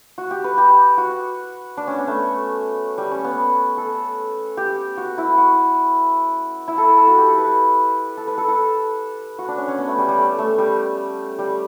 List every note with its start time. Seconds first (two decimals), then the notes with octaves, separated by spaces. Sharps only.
0.18 F#4
0.31 G4
0.44 B4
0.58 G4
0.98 F#4
1.77 D4
1.88 C#4
1.98 B3
2.07 A3
2.98 G3
3.11 C#4
3.24 B3
3.78 A4
4.57 G4
4.98 F#4
5.18 E4
5.38 F#4
6.68 E4
6.78 A4
6.97 A4
7.07 F#4
7.17 G4
7.28 A4
7.38 B4
8.17 A4
8.27 B4
8.38 A4
8.48 A4
9.39 F#4
9.48 D4
9.58 C#4
9.68 C#4
9.78 B3
9.88 A3
9.98 G3
10.08 G3
10.18 A3
10.38 A3
10.58 G3
11.39 G3